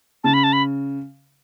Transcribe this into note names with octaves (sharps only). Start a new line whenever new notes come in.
C#3 A5
B5
A5
B5